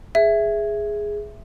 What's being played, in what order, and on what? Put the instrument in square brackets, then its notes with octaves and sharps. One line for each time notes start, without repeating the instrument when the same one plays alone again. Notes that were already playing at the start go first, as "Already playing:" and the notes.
[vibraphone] G#4 [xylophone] E5